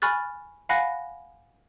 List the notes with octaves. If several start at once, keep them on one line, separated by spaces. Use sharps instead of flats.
G#5 B5 C#6 F6 F#6 A6
F5 F#5 G#5 B5 F#6 A#6